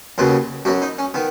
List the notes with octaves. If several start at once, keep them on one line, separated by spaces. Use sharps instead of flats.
D#2 C#3 F#3 B3 B4
F#2 F#3 B3 F#4
D#4
C#4
D#3 B3